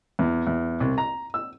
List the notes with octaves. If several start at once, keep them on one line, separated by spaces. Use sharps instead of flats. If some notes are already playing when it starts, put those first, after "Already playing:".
E2
E2
C2
A#5
E6